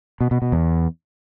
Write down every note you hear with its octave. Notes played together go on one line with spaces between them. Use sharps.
B2
B2
B2
E2